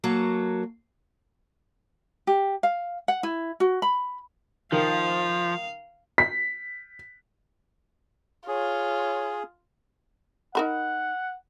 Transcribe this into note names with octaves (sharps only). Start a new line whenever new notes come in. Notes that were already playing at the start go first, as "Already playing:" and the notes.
F#3 A#3 F#4 A4
G4
F5
F#5
E4
F#4
B5
D#3 F3 F5
B6
F4 G#4 C#5
D#4 A#4 F#5 B5